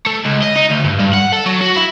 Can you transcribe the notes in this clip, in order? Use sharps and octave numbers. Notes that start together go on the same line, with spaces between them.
A3
C#2
D#5
D#4
D2
G2
G2
F#5
A4
F#3
F#4
E4